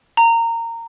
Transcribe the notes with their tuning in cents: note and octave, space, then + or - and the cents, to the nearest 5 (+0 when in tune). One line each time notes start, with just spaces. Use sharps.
A#5 -20